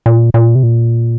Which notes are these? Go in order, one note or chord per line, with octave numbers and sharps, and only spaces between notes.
A#2
A#2
C3
A#2